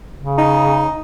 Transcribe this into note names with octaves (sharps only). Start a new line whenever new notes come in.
C#3
D#4